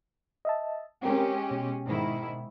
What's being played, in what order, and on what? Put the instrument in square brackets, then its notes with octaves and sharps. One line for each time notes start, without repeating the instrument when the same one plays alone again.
[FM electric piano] D#5 E5 A5
[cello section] G#3 C#4 G4 [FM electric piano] C4 A#4
[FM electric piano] B2
[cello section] G#2 D#3 E4